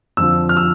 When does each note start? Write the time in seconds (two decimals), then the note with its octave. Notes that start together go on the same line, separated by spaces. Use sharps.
0.17 F2 D3 F3 E6
0.49 F6
0.57 E6